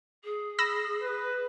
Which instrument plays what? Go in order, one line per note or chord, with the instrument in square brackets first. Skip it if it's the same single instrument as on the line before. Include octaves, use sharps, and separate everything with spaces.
[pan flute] G#4
[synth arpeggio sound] B5 E6 A#6
[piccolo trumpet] B4